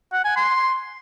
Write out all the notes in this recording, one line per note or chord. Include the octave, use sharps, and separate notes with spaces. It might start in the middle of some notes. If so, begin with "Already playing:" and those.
F#5
G#5
C6